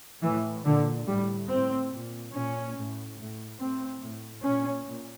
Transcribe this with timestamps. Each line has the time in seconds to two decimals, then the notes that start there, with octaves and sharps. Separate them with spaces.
0.23 A2 E3
0.65 A#2 D3
1.06 A2 G3
1.48 A2 C4
1.91 A#2
2.32 A#2 C#4
2.74 A2
3.16 A2
3.58 A2 C4
4.00 A2
4.42 A#2 C#4
4.84 A#2